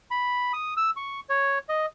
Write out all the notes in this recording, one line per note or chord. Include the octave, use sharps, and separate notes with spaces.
B5
D#6
E6
C#6
C#5
D#5